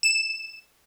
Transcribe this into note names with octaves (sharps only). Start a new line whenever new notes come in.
E7